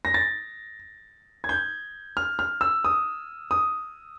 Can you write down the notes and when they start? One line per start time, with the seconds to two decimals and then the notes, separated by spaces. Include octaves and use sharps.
0.05 A#6
0.14 A6
1.44 G#6
1.49 G6
2.17 F6
2.39 F6
2.61 E6
2.85 D#6
3.51 D#6